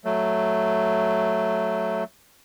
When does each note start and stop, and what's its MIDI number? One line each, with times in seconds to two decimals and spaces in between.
0.05 2.04 54
0.05 2.04 57